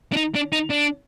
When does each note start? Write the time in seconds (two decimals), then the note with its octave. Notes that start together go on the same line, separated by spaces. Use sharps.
0.13 D4
0.17 D#4
0.35 D4
0.52 D#4
0.70 D4